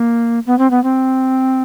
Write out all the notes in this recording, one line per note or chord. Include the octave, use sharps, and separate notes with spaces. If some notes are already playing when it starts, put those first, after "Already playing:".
Already playing: A#3
B3
C4
B3
C4